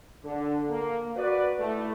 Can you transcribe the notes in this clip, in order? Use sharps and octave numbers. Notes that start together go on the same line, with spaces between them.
D3
A#3
F#4 B4 D5
A3 E4